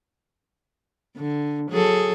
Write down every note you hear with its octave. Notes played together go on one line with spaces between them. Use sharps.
D3
F#3 G#4 A4